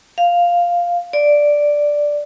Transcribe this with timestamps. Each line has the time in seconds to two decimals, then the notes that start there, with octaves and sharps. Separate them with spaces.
0.18 F5
1.13 D5